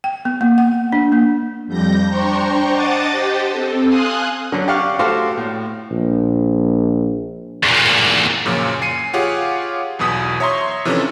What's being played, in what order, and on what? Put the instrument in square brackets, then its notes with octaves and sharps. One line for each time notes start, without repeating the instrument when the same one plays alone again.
[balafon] G5
B3
A#3
F#5
D4
A#3
[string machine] F2 G3 G6 A#6
D4 C5 G5 A#5 C6 C#6
D#5 F#5 A5 D6 D#6 A6
G4 C5 D#5 G5
C4 A4
F5 G#5 C6 D#6 F#6
[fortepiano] D3 F#3
G4 D5 F5 F#5 C#6 F6
A3 F#4 G4 C5 F5
A2
[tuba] A#1
[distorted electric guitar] E2 A#2
[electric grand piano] F#2 A#2 C#3 F3 C#4
G#5 C7 C#7 D#7
F4 G4 G#4 C#5 F5 F#5
B1 E2 B2 D#6 B6
C#5 E5 A#5 C6 C#6
C3 E3 F3 C#4 D4 A4